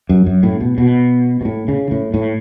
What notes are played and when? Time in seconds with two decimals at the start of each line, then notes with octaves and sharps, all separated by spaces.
0.09 F#2
0.26 F#2
0.43 A2
0.60 B2
0.78 B2
1.41 B2
1.45 A2
1.68 C#3
1.91 A2
2.14 A2